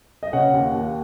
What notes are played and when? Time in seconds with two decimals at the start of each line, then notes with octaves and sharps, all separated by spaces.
0.23 D#5
0.33 C#3 C#5 F#5
0.53 D#2
0.75 D#2